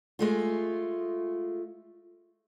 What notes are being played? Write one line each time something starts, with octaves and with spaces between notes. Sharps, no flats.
G#3 A3 F4